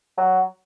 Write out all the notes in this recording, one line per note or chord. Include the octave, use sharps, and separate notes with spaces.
F#3